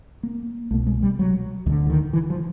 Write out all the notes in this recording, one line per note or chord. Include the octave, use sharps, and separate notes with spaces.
A#3
C2 B2 A3
G#3
G3
F#3
D2 D3 D#3
E3
D#3
E3
F3